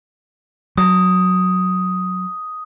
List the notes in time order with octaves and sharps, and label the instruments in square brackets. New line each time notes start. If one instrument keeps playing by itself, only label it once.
[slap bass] F#3 [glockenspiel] D#6